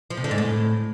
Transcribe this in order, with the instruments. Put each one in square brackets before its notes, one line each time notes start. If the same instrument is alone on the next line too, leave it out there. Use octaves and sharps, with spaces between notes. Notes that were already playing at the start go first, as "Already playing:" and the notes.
[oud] F3
C3
D3
G#2
A2